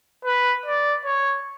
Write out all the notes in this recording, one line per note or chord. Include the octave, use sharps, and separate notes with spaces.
B4
D5
C#5